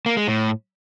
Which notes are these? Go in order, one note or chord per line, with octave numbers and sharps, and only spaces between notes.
A#3
G#3
A2